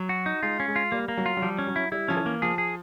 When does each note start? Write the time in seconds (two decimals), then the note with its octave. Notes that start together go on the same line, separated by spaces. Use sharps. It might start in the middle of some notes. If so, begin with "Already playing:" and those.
Already playing: F#3
0.09 F#4
0.26 D#4
0.43 G#3 F4
0.60 C#4
0.68 G#3
0.76 F4
0.92 G3 A#3
1.08 A#3
1.17 F#3
1.26 F4
1.37 F#3
1.42 F3 G3
1.59 C#4
1.67 F#3
1.76 E4
1.92 G3 E4
2.08 F3 C#4
2.17 E3
2.26 A#3
2.42 F3 G#4
2.58 G#4